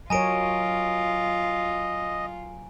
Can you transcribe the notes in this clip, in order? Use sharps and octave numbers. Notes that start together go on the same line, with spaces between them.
F#3 F4 A#4 C#5 D#5 G#5 A#5 D7